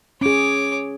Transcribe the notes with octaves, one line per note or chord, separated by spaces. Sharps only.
C#4 G#4 C#5 D6